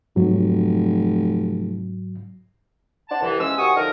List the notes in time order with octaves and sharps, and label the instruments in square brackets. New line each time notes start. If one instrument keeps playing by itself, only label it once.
[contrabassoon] F1 [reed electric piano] G#2 F#3
[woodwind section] D4 C5 F#5 A5
C2 E3
E2 F3 G#3 C#4 E6
D#2 C3 F#4 G#5 C#6 D#6
D3 F3 D#4 A#4